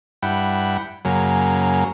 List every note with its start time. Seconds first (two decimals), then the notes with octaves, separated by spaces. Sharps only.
0.23 G2 E4 F#5 G5
1.05 F#2 C#3 F#3 A#3